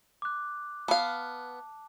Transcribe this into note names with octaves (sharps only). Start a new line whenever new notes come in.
D6 F#6
B3 F5 A5